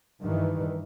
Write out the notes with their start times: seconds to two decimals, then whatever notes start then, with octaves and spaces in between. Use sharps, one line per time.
0.21 G2 D#3 E3